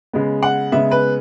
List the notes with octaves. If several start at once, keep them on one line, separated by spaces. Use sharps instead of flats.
C#3 G#3 B3
F#5
C#3 G#3 B3 E5
B4